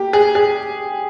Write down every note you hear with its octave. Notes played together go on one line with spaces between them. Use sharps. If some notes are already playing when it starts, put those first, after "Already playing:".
Already playing: A#3 G4
G#4
G#4